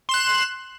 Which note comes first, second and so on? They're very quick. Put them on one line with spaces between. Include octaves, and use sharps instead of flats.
C6 E7 F#6